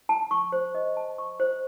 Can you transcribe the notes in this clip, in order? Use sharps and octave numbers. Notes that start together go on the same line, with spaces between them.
A5
C#6
C5
D#5
A5
C#6
C5